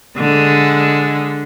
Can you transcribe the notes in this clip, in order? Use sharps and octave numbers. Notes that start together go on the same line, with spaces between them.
D3 G#3